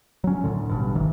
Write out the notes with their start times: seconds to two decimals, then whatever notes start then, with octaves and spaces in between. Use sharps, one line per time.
0.24 F#3 C#4
0.44 D2 A2 D3
0.69 A1 G2 B2
0.95 F#1 D#3 E3